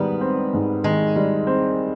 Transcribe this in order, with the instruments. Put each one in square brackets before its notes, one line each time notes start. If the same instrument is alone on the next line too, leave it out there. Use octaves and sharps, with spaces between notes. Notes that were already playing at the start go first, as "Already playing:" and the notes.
Already playing: [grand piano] G#2 D#3 G3 [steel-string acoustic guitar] B3
[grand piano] C4
G#2
[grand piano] D#3 [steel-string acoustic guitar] G#3
[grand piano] G3
C4